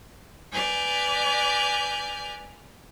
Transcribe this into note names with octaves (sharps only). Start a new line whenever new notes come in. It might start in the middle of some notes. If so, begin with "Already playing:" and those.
B4 D5 G#5 F6 G6